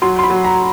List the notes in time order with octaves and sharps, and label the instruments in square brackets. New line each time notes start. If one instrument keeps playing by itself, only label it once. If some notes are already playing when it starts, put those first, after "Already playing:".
[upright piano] F#3 C6
C6
B5
F#3
A#5